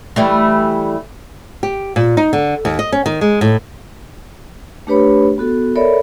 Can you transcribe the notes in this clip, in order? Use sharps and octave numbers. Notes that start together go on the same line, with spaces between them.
E3 G3 A3
G4
A#2
D#4
D3
D#2
D#5
C#4
D#3
G#3
A2
A3 D4 G4 B4 C#5 B5
B3 F#4 A4
A4 A#4 C#5 D5 E5 B5